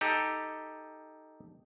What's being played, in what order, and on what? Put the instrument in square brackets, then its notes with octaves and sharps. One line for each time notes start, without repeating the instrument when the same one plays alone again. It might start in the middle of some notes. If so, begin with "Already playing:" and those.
[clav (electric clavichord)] D#4 G4 A4